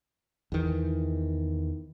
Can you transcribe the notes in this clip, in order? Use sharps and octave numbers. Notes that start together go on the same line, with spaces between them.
E2 D#3 E3